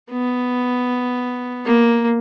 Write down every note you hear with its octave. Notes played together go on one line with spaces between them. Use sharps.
B3
A#3